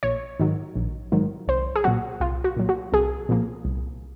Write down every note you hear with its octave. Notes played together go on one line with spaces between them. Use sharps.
A#1 C#5
G#2 D#3 F#3
A#1
G#2 D#3 F#3
C2 C5
G#4
A#2 F#3 F#4
C2 F4
F#4
A#2 F#3
F#4
C2 G#4
A#2 F3 A#3
C2